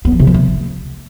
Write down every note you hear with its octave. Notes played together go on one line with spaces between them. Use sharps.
B3
F3
C3
F3
A3